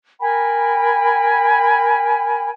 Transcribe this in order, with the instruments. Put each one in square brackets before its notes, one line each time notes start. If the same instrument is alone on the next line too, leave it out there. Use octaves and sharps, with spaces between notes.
[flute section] A#4 G5 G#5 B5